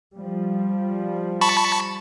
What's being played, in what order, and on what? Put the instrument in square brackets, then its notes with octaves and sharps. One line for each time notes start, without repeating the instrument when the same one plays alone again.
[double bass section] F3 G3
[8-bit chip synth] A5 B5 C#6